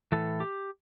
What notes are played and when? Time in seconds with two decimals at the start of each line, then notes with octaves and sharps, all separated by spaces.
0.12 A2 E3 A4
0.40 G4